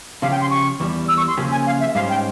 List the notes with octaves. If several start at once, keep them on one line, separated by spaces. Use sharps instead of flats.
C#3 F3 C#4 G4 F5
G5
C6
C#6
E2 E3 G3
E6
C#6
C6
C#3 F3 A#3 C#4 G4
G#5
F5
E5
G#2 G3 C#4 G4 C5 F5
G5